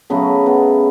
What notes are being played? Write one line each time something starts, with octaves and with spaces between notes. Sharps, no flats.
C#3 F#3 A3 B3 B4
B3 B4